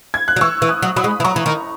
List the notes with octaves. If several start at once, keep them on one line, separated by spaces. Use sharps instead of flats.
G#6
F#6
F#3
E3 C#6 E6
E3
D#6 F#6
F#3
F#3 B5 D#6
G#3
E3
F#3 A#5 C#6
E3
D#3